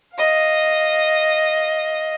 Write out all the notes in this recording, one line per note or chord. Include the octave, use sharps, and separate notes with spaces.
D#5 F5